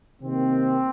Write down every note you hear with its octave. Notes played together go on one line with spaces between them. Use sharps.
C3 D#3 A#3 C4